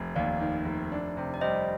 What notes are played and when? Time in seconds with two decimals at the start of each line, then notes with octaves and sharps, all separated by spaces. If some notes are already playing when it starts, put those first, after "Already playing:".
Already playing: F1
0.16 D#2 D5 F5
0.41 D#3
0.65 F1
0.92 D4
1.17 C3
1.34 D5
1.41 G3 C5 D#5